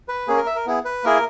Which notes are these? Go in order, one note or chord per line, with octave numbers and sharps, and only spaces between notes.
B4
A#3 C#4 G#4
A#4
E5
A#4
B3 E4 G#4
B4
A#3 E4 G#4 A#4